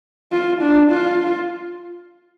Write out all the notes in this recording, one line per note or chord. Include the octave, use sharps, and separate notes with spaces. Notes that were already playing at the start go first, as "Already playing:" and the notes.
F4
D4
F4